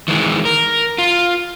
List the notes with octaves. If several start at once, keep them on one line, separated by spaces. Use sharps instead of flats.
D#3 E3 G#3
A#4
F4